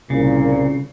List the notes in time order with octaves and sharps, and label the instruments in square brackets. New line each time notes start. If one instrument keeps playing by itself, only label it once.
[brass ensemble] C2 A#2 [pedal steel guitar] C#3